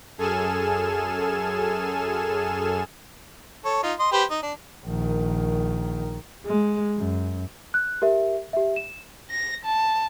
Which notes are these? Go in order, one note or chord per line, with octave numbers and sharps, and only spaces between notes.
F#2 G#4 A4 G#5 F6 E7
A4 C#5
D#4 F4
D#5 C6
G4 B4 C5
D#4
D4
A#1 D#3
G#3
F#2
F#6
G4 A#4 E5
G4 E5
E7
A#6
A5